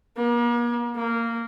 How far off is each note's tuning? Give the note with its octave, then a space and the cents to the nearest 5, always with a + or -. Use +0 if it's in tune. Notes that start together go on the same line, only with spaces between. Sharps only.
A#3 +40
A#3 -15